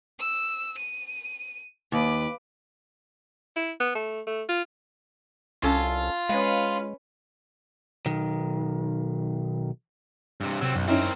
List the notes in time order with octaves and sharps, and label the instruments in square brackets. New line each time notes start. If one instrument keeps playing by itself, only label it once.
[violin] E6
D#7
[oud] D#2 [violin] B4 D6
[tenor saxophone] E4
B3
A3
A3
F4
[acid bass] C2 [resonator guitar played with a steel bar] C#4 A4 [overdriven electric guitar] F4
[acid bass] G#3 [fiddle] C#4 B4 [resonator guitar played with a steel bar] F5
[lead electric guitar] B1 D#3
G2 C3
[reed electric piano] C3 E6 [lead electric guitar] F#3 C4
[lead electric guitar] B1 [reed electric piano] F#2
[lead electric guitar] C4 A#4 [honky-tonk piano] C#4 D#4 E4